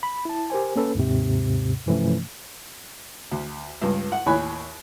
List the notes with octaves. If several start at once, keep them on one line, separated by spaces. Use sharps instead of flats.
B5
E4 A5
G4 A#4 C5 G#5
A#3 C#4 A4 B4
D#2 G#2 C3
G2 C3 E3 F3 A3 C#4
D2
C#2 G2
F#5
D#2 A2 C#5 G#5 B5 F#6